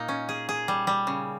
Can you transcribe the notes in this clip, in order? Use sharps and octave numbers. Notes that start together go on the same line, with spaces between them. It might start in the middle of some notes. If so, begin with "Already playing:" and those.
Already playing: A#2 A#3 D#4
C#4
G#4
G#4
G3
G3
C#3